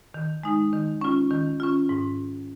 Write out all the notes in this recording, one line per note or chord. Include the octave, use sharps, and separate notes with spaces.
D#3
G#3 D#4
D#3
C#4 F4
D#3
C#4 F4
G#2